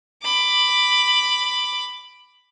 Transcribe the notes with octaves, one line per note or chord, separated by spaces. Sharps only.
B5 D6